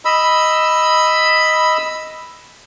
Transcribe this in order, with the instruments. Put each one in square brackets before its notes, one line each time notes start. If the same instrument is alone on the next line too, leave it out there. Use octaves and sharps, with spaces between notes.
[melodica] D#5 B5 E6